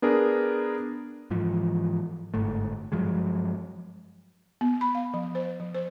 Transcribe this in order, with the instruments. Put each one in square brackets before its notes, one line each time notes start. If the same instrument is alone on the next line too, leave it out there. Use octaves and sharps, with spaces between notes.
[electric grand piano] B3 D4 G#4 A#4
[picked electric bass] G#2 E3 F3
G1 G#2 A3
G2 F3 F#3 G#3
[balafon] B3
B5
F5
F3
C5
F3
C5